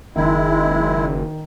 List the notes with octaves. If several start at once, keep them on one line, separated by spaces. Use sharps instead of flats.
F#1 D#3 G#3 E4